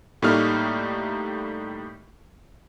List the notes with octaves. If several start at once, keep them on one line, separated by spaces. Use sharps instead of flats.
A2 G3 A3 A#3 D#4 F6